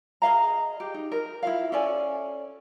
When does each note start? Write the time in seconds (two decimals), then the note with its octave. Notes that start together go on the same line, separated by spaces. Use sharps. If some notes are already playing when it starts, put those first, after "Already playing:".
0.22 G#4 D#5 F5 A#5
0.80 G4
0.94 D#4
1.12 A#4
1.43 E4 F4 F5
1.72 C#4 A4 D5 G#5